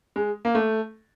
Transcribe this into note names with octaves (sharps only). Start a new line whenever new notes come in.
G#3
A#3
A3